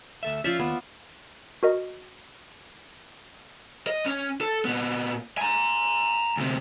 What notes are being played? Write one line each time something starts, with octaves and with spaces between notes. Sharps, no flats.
D2 A4 E5
F3 C#4 F4 D5 E5
D#2 B3
F#4 A#4 D#5
D#5
C#4
A4
A#2 B3
G#5 A#5
D2 C3